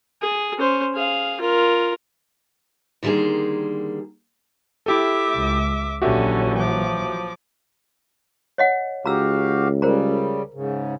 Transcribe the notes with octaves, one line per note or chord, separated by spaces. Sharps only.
G#4
C#4 C5
G#4 F5
F4 A#4
D3 D#3 G3 A#3 G#4 C5
E4 G4 A4 E5 D6
C#2
A#1 D3 E3 F#3 C#4 F#4 G4 E5
F3 D6
C#5 D#5 F#5
C#2 F#4 G4 F5 A#5 E6
C#3 G3 A#4 C5 A#5
G#2 C#3